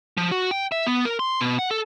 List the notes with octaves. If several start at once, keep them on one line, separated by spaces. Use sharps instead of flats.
F3
F#4
G5
E5
B3
A#4
C6
B2
F#5
A4